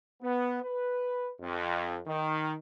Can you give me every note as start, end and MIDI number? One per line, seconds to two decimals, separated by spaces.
0.22 0.57 59
0.62 1.30 71
1.40 1.98 41
2.06 2.54 51